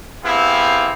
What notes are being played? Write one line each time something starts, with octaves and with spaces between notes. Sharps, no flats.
B3 C4 E4 G4 G#4 F5